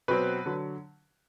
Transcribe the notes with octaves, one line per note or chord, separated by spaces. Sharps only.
B2 F#3 C4 B4
D3 F#3